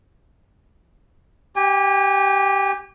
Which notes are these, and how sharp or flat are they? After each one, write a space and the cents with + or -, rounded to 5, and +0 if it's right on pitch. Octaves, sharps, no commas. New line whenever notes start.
G4 -10 G#5 -45